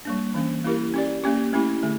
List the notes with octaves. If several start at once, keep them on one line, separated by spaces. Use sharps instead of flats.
G3 A#3 D4
E3 A#3 C#4
A#3 E4 G4 A#4
C#4 G4 D5
A#3 C#4 G4
A3 C#4 E4 G4
D3 A3